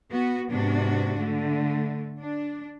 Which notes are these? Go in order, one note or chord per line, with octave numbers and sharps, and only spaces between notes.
B3 F#4
G#2 C3 B3 D4 F#4
D3 A3
D4